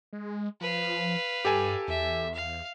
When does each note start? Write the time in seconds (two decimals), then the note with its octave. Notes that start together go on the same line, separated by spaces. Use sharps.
0.13 G#3
0.61 F3 B4 F5
1.45 G2 G4 A4 G#5
1.88 E2 E5
2.35 F5